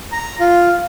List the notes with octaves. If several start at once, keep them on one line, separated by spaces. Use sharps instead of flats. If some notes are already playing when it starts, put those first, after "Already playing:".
A#5
F4